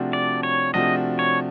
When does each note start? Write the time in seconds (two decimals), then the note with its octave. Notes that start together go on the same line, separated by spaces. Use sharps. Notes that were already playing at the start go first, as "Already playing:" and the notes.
Already playing: C3 F3 A3 D4 F#4
0.13 D5
0.43 C#5
0.74 C3 F3 A3 D4 F#4 D#5
1.19 C#5